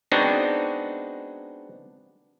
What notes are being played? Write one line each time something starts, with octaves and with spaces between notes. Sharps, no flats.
G#3 B3 C4 D4 D#4 F#4